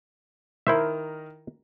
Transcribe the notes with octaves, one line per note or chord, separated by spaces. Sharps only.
D#3 E4 A#4 C5 E5